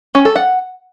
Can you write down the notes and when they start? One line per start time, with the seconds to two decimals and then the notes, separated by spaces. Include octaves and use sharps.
0.15 C#4
0.25 A4
0.36 F#5